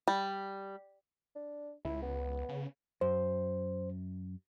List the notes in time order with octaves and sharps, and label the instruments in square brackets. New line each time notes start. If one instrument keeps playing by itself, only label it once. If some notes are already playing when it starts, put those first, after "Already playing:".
[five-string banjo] G3
[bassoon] D4
[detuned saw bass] C#2 [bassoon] E4
[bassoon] B3
[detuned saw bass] C#3
[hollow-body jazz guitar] F#2 [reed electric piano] C5